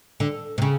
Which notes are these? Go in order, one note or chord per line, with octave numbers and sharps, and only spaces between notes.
D3
C3
C#3